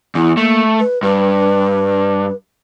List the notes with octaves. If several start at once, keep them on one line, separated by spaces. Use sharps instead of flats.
E2 E4
A3 A#3
B4
G2 B4